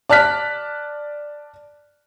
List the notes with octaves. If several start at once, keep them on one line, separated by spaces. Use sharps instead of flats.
D5 A5 F6 F#6 B6